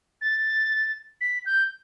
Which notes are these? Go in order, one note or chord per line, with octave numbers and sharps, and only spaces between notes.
A6
B6
G6